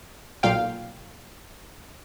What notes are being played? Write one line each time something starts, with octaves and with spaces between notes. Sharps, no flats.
B1 A#2 F5 G5